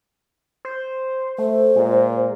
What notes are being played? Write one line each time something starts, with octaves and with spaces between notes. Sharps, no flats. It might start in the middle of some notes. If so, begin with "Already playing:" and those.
C5
A3 C5
A#2 G#3